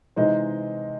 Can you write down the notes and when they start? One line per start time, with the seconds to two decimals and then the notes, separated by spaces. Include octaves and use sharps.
0.16 C3 E3 G#3 D#4 C5 D#5